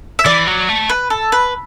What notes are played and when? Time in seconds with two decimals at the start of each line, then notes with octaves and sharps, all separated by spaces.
0.19 E5
0.26 E3 D5
0.47 F#3
0.69 A3
0.89 B4
1.10 A4
1.32 B4